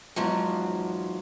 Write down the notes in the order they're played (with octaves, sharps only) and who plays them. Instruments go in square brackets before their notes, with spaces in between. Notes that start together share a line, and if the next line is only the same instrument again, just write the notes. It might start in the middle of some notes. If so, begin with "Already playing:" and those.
[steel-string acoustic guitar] E2 G#2 F3 F#3